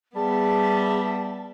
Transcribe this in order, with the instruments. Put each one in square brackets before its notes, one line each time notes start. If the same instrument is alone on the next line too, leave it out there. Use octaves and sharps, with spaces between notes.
[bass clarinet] G3 [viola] B3 E5 [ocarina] G#4 [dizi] A5